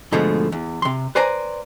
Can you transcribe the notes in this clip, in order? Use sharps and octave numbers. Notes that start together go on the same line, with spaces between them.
G#2 B2 D3 F3 A3
E2
C3 C6
B4 C5 D5 G#5 A#5